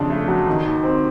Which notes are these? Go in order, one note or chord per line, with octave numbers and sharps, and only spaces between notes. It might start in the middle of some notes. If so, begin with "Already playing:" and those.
Already playing: F2 C#3 D4
A3
F#3
D#3
D#2
C4